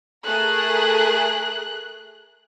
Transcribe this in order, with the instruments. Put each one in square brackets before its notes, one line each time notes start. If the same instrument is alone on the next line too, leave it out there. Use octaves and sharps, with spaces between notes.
[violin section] A3 G#4 A#4 [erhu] F#6